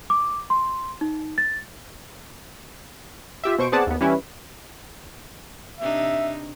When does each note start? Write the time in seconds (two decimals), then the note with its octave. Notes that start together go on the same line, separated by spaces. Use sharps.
0.10 D6
0.50 C6
1.01 D#4
1.38 A6
3.44 F4 G4 E5
3.58 B2 C5 C#6 D7
3.72 B3 C4 G#4 D5 F#5 A5
3.87 D#2 B3
4.01 E3 G3 C#4 E4 B4
5.80 C3 D4 D#4 E5